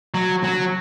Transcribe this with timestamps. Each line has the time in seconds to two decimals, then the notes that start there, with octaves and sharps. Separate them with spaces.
0.14 F#3
0.44 F#3